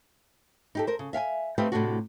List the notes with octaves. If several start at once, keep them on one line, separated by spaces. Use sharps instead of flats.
D#4 G4 A4
A#4 C5
C#3
E5 F5 G5 G#5
A3 C4 D#4 G4 B4 F5
A2 C3 F3 A3 D4 F#4